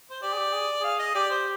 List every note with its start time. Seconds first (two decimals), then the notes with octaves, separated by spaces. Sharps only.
0.10 C5
0.22 G4 D5
0.33 G#4
0.38 G4
0.53 G#4
0.81 G#4 F5
0.99 D#5
1.15 G4 D5
1.30 C5